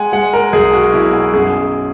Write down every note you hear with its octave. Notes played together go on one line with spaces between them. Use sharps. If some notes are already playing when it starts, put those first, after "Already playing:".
Already playing: G#3 F#5 G#5
G#3 F#5
A#4
B1 G#4
F#4
B2 E4
F#4
F#2 G#4